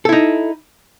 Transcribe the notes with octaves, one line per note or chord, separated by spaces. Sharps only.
D#4 E4 A4